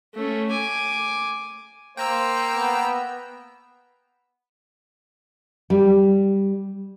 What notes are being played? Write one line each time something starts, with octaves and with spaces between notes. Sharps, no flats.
A3 C#4
G#5 D6
A#3 C5 G5 A#5 E6
B3
G3